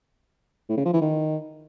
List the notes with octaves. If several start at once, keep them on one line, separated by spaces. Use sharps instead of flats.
A2
C#3
F3
E3
D#3